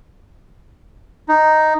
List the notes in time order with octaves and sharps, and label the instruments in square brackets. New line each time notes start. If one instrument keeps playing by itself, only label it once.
[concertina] D#4